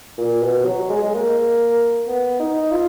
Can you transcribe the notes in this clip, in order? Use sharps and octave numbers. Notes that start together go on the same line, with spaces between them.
A#2
B2
F#3
G#3
G#3
A#3
B3
D#4
F4